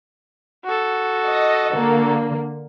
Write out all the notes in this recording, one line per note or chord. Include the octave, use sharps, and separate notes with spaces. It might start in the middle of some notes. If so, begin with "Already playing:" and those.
F#4 A4
D#5
D3 A#3